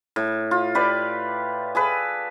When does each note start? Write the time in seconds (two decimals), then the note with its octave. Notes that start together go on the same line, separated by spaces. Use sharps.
0.16 A2
0.51 F4
0.75 G4 B4 D5
1.75 G#4 A4 B4